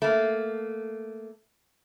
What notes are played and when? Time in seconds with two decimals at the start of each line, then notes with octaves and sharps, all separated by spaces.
0.02 A3 A#3